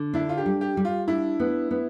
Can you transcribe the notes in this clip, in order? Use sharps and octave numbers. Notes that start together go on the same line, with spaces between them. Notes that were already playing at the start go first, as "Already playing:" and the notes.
Already playing: D3
D4 E4
F4
G4
G3
G4
G3
F4
D4 E4
B3
B3